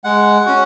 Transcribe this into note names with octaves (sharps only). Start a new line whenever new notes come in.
G#3 F#5
C#4 F#4